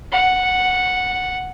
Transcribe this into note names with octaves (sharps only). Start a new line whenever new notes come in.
F#5